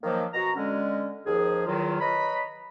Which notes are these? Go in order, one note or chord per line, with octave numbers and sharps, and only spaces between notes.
D#3 F3 F#3 A#3
B2 F#4 A#5
D3 G#3 C#4
D#2 F3 G#4
E2 D#3 F#3 F4
B4 C#5 D#5 A#5 B5